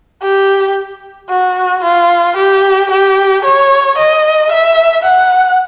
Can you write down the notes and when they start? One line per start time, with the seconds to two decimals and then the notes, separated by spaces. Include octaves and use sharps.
0.22 G4
1.30 F#4
1.83 F4
2.37 G4
2.91 G4
3.44 C#5
3.98 D#5
4.52 E5
5.05 F#5